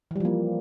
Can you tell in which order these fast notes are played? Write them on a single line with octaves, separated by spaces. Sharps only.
E3 G3 F3 A#3